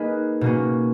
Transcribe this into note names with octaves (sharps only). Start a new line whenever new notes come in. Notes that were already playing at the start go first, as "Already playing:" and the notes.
Already playing: A#3 D#4 G#4 B4
B2 A#3 C#4